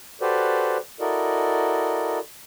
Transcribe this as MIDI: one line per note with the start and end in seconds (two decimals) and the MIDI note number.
0.21 0.78 66
0.21 0.78 67
0.21 0.78 69
0.21 0.78 71
0.21 0.78 72
0.21 0.78 74
1.00 2.19 64
1.00 2.19 66
1.00 2.19 69
1.00 2.19 70
1.00 2.19 74
1.00 2.19 75